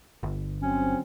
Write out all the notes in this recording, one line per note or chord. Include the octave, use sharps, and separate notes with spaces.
G1
D3 F#3 C4 C#4